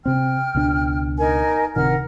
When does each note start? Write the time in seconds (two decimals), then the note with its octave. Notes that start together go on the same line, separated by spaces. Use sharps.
0.06 C3 C4 G5 F6
0.54 C#2 B2 D4
1.19 D#4 A#4 G#5
1.76 D1 C3 D#3 A#4 F#5 F6